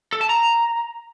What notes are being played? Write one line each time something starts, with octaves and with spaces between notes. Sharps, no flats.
A4
A5
A#5